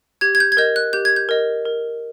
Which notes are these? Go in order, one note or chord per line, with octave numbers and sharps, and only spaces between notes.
G4 G#6
G#6
G6
G#6
A#4 D#5 G6
F#6
G4 G6
G#6
G6
A#4 D#5
A#4